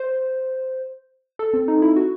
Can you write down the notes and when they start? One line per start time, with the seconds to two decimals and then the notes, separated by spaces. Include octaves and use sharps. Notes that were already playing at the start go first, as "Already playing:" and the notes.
Already playing: C5
1.39 A4
1.54 C4
1.68 D#4
1.82 E4
1.96 F#4